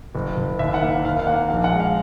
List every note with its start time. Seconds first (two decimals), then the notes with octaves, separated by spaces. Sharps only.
0.15 F#1
0.37 F#1
0.59 D#2 E5
0.74 F#5
0.82 A#3 F5
1.05 D#2 F5
1.19 F5
1.27 A#3 F#5
1.50 A#1 F5
1.64 F#5
1.72 G#3
1.80 F5